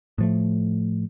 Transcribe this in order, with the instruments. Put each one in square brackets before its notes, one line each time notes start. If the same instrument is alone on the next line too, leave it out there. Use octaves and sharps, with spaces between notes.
[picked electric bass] A2 F3 A3